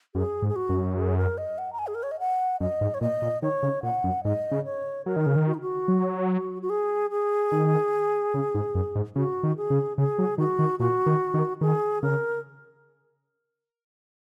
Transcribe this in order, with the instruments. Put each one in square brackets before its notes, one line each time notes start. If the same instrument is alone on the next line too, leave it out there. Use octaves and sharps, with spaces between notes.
[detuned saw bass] F#2 [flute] G#4
[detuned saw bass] G#2
[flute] G#4
F#4
[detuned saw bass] F#2
[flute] G#4
A#4
D#5
F#5
A#5
G#5
G#4
A#4
C#5
D#5
F#5
[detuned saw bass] F#2 [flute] D#5
[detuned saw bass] G#2
[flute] C#5
[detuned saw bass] A#2 [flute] D#5
[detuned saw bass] A#2
[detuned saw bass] D#3 [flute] C#5
[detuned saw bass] C#3
[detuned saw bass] A#2 [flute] F#5
[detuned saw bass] F#2
[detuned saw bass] G#2 [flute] D#5
[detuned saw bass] C#3
[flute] C#5
[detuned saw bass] F#3 [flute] A#4
[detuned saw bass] D#3
C#3
D#3
[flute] F#4
D#4
F#4
[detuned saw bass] F#3
[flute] F#4
G#4
G#4
[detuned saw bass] D#3
C#3
G#2
F#2
G#2
[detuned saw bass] C#3 [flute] F#4
[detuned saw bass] D#3
[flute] G#4
[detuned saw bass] C#3
[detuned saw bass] C#3 [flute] G#4
[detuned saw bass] F#3
[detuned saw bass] D#3 [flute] F#4
[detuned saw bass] D#3
[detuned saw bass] A#2 [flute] F#4
[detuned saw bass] D#3
D#3
[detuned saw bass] D#3 [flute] G#4
[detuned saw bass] C#3 [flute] A#4